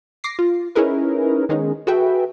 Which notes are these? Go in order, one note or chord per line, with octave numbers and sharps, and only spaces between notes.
D6 A#6 C7
F4
C#4 D#4 E4 G#4 A#4 B4
D#3 G#3 B3 C#4 D#4
F#4 G#4 A4 B4 E5 G5